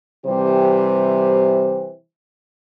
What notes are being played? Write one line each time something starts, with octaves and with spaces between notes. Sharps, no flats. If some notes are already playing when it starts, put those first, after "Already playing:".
C3 E3 G3 G4 C5